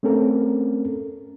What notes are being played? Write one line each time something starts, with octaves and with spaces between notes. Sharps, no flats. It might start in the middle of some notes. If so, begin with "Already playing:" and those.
A3 C4 C#4 A4 A#4